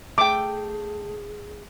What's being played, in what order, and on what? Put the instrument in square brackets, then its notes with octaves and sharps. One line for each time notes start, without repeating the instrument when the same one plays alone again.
[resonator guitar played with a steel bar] A3 G5 [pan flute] G#4 [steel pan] D6